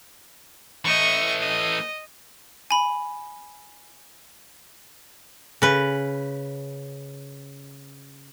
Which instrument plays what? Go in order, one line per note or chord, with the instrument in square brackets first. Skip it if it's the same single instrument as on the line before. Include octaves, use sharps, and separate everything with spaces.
[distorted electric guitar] E3 A3 [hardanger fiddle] D#5 C#6
[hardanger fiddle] D#5
[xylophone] G#5 B5
[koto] C#3 B4